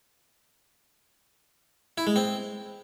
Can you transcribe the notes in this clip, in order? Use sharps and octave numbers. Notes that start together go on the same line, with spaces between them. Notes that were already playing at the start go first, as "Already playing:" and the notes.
E4
G#3
C4